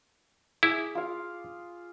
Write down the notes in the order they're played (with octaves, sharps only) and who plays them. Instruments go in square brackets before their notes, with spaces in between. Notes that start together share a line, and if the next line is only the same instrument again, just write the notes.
[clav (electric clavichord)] E4 [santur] G#4 D6
[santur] F4 F5